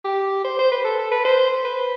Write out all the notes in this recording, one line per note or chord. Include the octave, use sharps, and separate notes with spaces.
G4
C5
C5
B4
A4
A4
B4
C5
B4